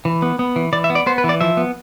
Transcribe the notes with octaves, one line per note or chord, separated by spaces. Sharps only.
E3
B3
B3
E3
E3 D5
E5
B3
D5
B3 C5
B4
E3
D5
F3 E5
B3